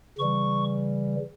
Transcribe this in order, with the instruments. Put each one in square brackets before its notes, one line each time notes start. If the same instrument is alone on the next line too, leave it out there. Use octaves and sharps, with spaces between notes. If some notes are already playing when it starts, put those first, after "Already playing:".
[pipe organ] C#3 E3 G3 C#6